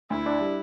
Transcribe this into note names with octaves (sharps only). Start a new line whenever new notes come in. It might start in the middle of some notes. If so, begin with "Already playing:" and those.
D2 E4
D4
G3